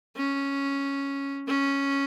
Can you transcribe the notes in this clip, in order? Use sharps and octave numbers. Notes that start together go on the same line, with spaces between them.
C#4
C#4